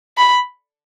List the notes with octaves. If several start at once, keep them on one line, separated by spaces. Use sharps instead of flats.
B5